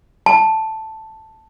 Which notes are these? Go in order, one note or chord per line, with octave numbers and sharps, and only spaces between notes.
A5